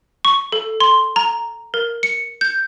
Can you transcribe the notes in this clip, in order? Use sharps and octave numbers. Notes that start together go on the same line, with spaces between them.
C#6
A4
C6
A#5
A#4
C#7
G6